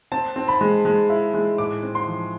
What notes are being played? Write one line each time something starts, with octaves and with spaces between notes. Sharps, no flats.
C4 A5
C4
B5
G#3
G#3
E4
G#3
A2 D6
C4
C6
F3